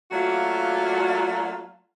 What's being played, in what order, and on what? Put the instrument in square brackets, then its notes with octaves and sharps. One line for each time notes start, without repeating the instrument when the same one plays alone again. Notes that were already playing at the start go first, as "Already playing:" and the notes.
[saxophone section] F#3 A3 A#3 D4 F4 F#4